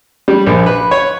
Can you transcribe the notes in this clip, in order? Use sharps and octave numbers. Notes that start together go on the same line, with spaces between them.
G3
A#1
B4
C#5